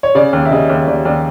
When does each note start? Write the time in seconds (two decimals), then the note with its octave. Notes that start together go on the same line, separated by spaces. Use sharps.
0.03 C#5
0.15 C#3 D5
0.33 D#2
0.45 E5
0.51 C#3 D#5
0.69 D#2
0.87 D#2 D5
1.05 D#2 D5